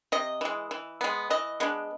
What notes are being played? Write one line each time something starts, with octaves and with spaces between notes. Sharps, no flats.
C3 D#5
E3 G#3
E3
G#3 B3
E3 D#5
G#3 B3 D4